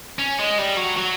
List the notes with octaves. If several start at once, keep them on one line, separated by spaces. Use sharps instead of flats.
C#4
G#3
G3
F#3
F#3